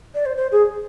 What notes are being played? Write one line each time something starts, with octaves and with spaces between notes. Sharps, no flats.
D5
C5
C5
G#4